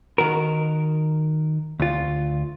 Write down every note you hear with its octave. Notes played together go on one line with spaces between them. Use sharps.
D#3 F#4 A#4
D2 F4